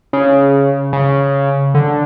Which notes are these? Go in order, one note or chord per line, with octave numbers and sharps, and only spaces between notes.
C#3
C#3
D3